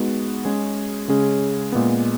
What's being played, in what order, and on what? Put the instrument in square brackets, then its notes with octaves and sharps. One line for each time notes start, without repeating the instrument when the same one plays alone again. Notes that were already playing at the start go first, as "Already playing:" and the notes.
Already playing: [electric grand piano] G#3 B3 D#4 F#4
G#3 C#4 G#4
C#3 G#3 C#4 G#4
A#2 G#3 B3